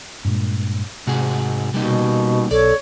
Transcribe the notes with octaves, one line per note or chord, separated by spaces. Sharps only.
G2 A#2 G#3
G#2 C3 F#4 G#4
B2 G3 A#3 D#4
B1 A4 C#5 D5